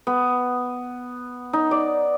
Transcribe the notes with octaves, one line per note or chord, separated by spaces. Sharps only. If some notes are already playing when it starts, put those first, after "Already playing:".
B3
D#4
D5